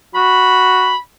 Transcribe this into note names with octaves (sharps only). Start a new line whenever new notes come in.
F#4 B5